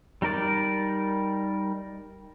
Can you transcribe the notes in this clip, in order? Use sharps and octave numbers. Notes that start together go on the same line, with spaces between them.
G3 D#4 A#4 D5